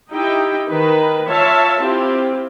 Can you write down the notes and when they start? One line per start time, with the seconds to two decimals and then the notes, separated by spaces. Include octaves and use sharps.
0.11 D#4 E4 G4 D#5 G5
0.69 D#3 B4
1.28 F4 C#5 E5 F5 A5
1.81 C4 E4 F4 G4